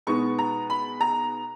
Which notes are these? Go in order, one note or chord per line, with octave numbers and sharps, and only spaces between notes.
B2 G#3 B3 D#4 C#6
A#5
B5
A#5